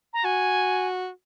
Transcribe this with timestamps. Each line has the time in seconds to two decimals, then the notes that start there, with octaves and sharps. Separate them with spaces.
0.13 A#5
0.24 F#4 G#5